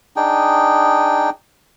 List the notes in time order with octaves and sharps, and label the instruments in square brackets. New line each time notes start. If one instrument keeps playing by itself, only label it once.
[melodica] D4 D#4 G#4 G5